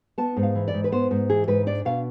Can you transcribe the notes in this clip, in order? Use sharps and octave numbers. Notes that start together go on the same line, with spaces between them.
B3 A5
G#2
F5
E3
D5
G#2
B4
B3 C5
G#2
E3 G#4
G#2 B4
D4 D5
B2 F5